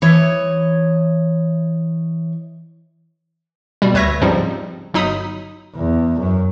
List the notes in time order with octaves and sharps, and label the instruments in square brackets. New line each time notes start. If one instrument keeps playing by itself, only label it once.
[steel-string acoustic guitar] E3 C#5 D#5
[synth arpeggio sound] B2 G3
D2 B4 C#5 E5 A#6
G#2 C#3 F3 G3 C4 D#4
G1 F#3 D#4 B5 D#6
[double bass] E2
F#2